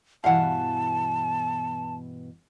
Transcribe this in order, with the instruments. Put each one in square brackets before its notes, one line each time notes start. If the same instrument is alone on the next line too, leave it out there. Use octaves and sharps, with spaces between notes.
[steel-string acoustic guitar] G2 B2 E3 [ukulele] F5 F#5 [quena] A5